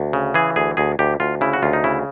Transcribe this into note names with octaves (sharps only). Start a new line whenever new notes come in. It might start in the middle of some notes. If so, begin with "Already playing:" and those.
Already playing: D2
C#3
E3 G#4
D2 G#4
D2 G#4
D2 G4
D2 F4
C#3 E4
F#4
D2 F4
D#4
C#3 E4